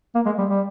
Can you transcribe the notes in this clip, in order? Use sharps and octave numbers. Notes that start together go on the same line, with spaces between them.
A#3
G#3
G3
G3